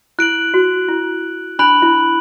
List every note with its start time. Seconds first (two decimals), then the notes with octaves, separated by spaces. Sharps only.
0.19 E4 F#6 D7 F#7
0.54 F#4
0.88 E4
1.59 D4 B5 F#6 D7 F#7
1.82 E4